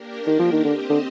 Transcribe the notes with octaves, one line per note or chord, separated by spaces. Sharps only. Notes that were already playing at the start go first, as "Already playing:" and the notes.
Already playing: A#3 D4 G4 A#4
D#3
F3
D#3
D3 C4 G4 C5 D#5
D3